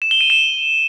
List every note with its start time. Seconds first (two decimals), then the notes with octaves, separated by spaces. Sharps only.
0.02 E7
0.11 G7
0.21 D#7
0.30 E7